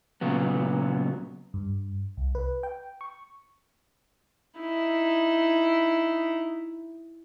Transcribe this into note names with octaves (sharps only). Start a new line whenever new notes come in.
A#2 C#3 F#3 B3
G2
C2
B4
G5
C#6
D#4 E4